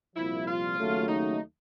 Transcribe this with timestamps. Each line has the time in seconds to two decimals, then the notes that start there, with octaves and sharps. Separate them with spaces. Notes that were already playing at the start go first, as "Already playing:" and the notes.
0.16 C2 A#2 F3 E4
0.47 F4
0.77 D#2 C#3 F#3 A3
1.08 D#4